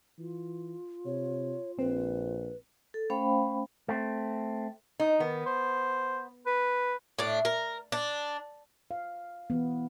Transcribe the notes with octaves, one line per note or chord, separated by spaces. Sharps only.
E3 F4
C3 C#5
A#1 C4 B4
A4
A3 C#4 C5 F5 G5 B5
A3 C4
D#4
D#3 B3
C5
B4
A2 D4
A#4
D4
F5
E3 B3